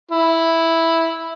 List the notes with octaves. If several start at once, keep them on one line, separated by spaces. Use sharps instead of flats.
E4